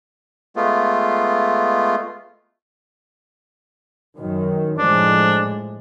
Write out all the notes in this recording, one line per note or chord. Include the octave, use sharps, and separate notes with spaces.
G#3 A3 B3 F4
F#2 D#3
A2 F3 G#3 D4